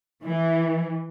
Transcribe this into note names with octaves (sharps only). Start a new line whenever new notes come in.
E3